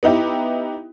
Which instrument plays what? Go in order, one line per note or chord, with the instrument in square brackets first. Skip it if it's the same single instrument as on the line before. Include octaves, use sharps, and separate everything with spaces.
[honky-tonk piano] B3 D#4 E4 G4